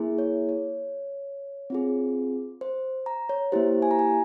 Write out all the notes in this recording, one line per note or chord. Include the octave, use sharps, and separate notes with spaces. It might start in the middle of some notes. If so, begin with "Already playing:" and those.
Already playing: A#3 E4 G#4
C#5
C#5
C4 F4 G#4
C5
A#5
C#5
A#3 E4 G4 C5
G#5
A#5
G#5